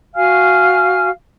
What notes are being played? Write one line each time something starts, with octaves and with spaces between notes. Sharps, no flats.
F#4 F5 G#5 F6